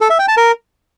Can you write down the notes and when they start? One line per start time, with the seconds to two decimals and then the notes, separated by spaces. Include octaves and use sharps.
0.01 A4
0.10 E5
0.19 G5
0.28 A5
0.37 A#4